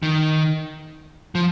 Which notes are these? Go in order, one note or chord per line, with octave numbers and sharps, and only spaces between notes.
D#3
F3